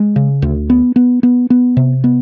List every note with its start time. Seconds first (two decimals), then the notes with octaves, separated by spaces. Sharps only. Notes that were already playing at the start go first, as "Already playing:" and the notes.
Already playing: G#3
0.16 C#3
0.42 D2
0.70 B3
0.96 B3
1.23 B3
1.50 B3
1.77 C3
2.04 B3